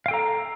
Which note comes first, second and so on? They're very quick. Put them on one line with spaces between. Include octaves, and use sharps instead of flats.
F5 G5 A4 A#5